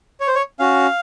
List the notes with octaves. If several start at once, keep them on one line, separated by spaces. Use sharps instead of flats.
C#5
C5
C#5
C#4 F#4 F5